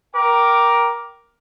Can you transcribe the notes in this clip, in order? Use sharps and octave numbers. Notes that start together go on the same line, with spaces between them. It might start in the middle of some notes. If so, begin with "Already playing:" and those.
A#4 G5 D6